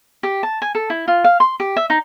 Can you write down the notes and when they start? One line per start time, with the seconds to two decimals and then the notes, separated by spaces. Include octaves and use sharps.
0.23 G4
0.43 A5
0.62 G#5
0.75 A4
0.90 E4
1.08 F4
1.24 F5
1.40 C6
1.60 G4
1.76 E5
1.90 D#4